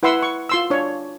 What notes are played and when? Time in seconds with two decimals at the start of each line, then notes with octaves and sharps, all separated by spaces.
0.03 E4 B4 F#5 C6 E6
0.22 C#6
0.49 F4 C6 E6
0.70 D4 C#5